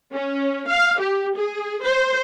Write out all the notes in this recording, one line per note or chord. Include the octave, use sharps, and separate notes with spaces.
C#4
F5
G4
G#4
C5